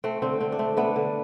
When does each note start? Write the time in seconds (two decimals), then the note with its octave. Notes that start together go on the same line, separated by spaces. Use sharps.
0.04 A3 C4
0.22 D3 C4
0.41 D3 C4
0.52 D4
0.59 A3 C4
0.77 A3 B3 D4
0.96 D3